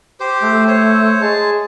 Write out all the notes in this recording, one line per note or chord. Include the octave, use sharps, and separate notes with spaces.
G4 C5
A3
C5 C#5
G#3 G#4 A5